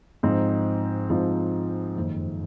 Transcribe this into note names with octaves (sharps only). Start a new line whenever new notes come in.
G#2 F3 C4 D#4
G#2 F3 C4 D#4
F#1 F2 D#3